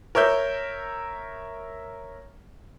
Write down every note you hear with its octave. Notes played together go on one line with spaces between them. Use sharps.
A#4 C#5 E5 G6